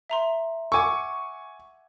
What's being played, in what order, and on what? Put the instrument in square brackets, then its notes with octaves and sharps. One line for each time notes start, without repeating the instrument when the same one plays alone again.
[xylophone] E5 A#5 C6
[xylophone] F#5 D6 E6 [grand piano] G#5 C#6